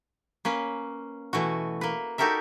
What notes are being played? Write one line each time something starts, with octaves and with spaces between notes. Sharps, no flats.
A#3 C#4 B4
B2 E3 A3 F#4
A#3 B4
D#4 F#4 G4 A4 A#4 E5